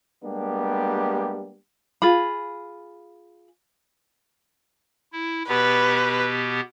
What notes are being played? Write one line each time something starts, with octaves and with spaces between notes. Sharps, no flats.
G3 G#3 A#3 B3 D4 G4
F4 G#4 B5
E4
B2 B3 G4 B4